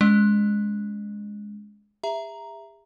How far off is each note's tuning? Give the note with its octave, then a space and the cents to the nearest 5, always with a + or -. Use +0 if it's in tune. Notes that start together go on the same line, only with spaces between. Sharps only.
G#3 +0 C#4 +20 D#5 -45
G#4 -45 E5 +10 A#5 +0